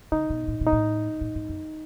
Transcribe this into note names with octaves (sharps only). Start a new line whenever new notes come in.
C#3 D#4
B2
A2
B2
D#4
A2
A2
G#2
F#2